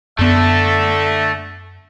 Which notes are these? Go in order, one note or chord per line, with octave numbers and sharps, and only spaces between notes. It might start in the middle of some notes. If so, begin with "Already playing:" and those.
F#2 D3 A3 B3 A4 E5 A5